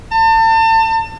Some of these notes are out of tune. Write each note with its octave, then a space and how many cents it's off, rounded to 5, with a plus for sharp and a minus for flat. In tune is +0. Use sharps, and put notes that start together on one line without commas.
A5 +35